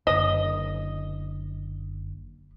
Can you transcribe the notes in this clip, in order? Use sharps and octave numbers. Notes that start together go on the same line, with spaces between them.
F#1 D3 D#5